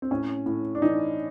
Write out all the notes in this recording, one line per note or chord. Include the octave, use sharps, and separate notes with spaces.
C4
A2 C#4
A2
D4
E3 D#4